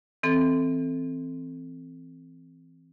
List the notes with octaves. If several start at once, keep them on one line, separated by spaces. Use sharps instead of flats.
E3 C4 A4